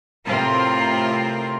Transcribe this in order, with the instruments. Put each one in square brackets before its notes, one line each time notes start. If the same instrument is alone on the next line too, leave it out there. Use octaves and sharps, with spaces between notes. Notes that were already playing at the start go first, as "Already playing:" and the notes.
[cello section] A2 C3 C4 F4 A#4 C5